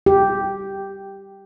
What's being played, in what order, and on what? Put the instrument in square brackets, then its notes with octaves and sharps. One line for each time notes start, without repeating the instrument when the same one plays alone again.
[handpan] G4